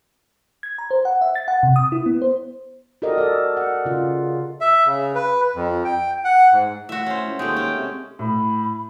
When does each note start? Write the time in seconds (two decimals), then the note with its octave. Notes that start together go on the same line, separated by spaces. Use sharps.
0.63 G#6
0.78 A#5
0.91 C5
1.05 F#5
1.22 E5
1.35 A6
1.48 F#5
1.63 C3
1.76 D#6
1.92 E4
2.06 B3
2.22 C5
3.02 F#4 G4 A4 A#4 D5 D#5
3.18 A4 D5
3.57 F#5
3.85 C#3 F4
4.61 E5
4.86 C#3
5.15 B4
5.55 F2
5.85 G5
6.25 F#5
6.52 G#2
6.89 A2 F#4 E5
7.06 C#4 C5
7.28 C#2
7.39 D#2 G#3 A3 G5
7.56 C#4
7.76 C3
8.19 A2 B5